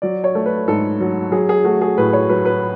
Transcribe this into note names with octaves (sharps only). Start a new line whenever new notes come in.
F#3 D5
C#5
A3
B4
G#2 A4
F#3
F#3 G#4
G#4
A3 F#4
G#4
A2 B4
C#5
F#3 B4
B4